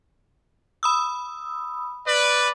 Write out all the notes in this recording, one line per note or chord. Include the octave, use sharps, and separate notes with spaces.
B5 D#6 E6
B4 D5